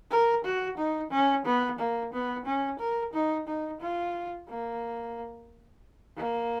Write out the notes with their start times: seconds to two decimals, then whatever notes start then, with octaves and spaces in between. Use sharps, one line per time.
0.11 A#4
0.44 F#4
0.77 D#4
1.11 C#4
1.46 B3
1.79 A#3
2.13 B3
2.45 C#4
2.79 A#4
3.13 D#4
3.47 D#4
3.81 F4
4.49 A#3
6.16 A#3